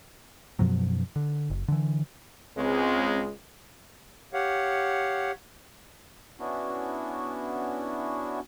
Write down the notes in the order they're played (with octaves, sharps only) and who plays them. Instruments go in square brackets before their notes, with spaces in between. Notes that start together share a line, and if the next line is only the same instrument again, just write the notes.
[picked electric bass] F#2 B2 F3 F#3
D3
F#1
D3 E3
[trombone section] C#2 G#3 [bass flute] C4
[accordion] G4 C#5 F5 F#5
[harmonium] B3 C#4 D4 E4 F#4